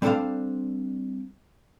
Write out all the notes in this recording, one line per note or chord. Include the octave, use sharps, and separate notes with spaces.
G3 C4 D4 A4 C5 F5